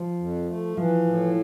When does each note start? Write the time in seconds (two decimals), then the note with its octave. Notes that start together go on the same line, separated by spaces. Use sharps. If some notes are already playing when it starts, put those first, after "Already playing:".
Already playing: F3
0.18 F2
0.47 A3
0.77 E3 F3
1.06 A2